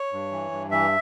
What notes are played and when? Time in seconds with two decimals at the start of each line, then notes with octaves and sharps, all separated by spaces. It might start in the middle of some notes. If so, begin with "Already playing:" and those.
Already playing: C#5
0.13 G2
0.32 E3
0.51 G2
0.71 E3 E5